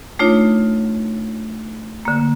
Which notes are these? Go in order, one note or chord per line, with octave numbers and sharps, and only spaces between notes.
A3 D4 D#4 F4 C#5
D3 A#3